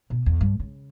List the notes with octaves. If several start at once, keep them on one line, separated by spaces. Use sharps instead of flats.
B2
E2
G2
C#3